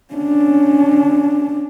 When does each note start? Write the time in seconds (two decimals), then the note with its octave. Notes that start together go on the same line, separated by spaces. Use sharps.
0.14 C#4 D4